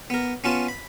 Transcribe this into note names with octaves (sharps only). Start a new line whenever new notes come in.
B3 A#4
B3 C#4 F4 A5
B5